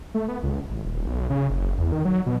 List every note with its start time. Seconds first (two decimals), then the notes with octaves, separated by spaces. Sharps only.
0.14 A3
0.28 B3
0.43 C#2
0.70 A1
0.84 D#1
1.07 B1
1.30 C#3
1.50 F#1
1.78 E2
1.92 D#3
2.05 F#3
2.26 B2